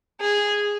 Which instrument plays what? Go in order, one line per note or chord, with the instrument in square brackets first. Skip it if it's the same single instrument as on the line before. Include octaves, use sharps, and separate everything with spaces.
[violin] G#4